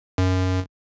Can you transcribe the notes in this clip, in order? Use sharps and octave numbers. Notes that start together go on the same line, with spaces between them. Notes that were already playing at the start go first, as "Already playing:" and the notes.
F#2